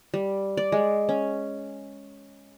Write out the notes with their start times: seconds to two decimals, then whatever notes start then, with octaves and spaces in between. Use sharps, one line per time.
0.14 G3
0.57 D5
0.72 G#3
1.09 C#4